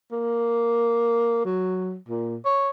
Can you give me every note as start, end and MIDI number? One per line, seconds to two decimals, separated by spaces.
0.12 1.43 58
1.45 1.96 54
2.08 2.37 46
2.45 2.70 73